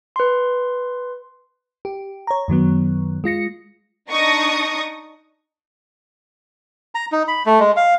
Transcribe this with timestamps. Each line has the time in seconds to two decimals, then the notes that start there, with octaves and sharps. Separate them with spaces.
0.16 B4 C6
1.85 G4
2.27 C#5 A#5
2.48 F#2 D#3 F#3 B3
3.24 G#3 F4 A#6 C#7
4.10 D4 D#4 C#6 D#6 A#6
6.95 A#5
7.12 D#4
7.28 B5
7.46 A3
7.60 G#3
7.77 F5